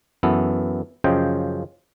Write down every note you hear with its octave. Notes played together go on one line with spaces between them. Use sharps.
F#2 E3 B3 A4
F#2 C#3 F3 C5 D#5 G5